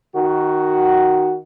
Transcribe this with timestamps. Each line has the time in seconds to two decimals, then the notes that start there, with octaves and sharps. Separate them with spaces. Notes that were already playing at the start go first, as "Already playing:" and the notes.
0.15 D#3 F#4